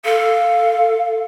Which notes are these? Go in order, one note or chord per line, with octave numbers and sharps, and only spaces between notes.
A4 F5